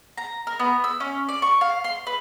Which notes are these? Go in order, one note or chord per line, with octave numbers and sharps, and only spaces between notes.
A#5
A#4
B3
E6
C#4
D5
C#6
F5
C6
B4